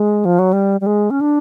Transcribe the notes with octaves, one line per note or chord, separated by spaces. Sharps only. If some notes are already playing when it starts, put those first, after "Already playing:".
Already playing: G#3
F3
F#3
G3
G3
G#3
C#4
D4